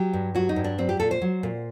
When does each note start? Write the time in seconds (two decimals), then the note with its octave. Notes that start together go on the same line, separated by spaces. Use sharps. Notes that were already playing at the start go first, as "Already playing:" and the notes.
Already playing: F#3 G4
0.13 G2
0.35 F#3 F#4
0.49 D#4
0.56 G2
0.64 D4
0.78 F#3 C4
0.89 G4
1.00 A#2 A4
1.11 C5
1.22 F#3
1.43 A#2